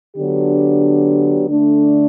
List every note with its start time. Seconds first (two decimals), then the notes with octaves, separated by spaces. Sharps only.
0.16 D3 F#3 B3 D4 G4
1.47 D3 A3 D4